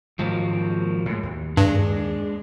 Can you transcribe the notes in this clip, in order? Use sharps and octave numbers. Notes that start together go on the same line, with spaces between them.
G#2 D#3 F3 F#3 A#3
A2 G#3
D#2
G2 G#3 D4